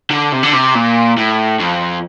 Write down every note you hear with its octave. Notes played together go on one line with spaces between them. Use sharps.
D3
C3
D3
C3
A#2
A2
F2